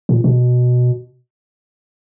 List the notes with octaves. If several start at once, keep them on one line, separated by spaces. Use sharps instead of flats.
A#2
B2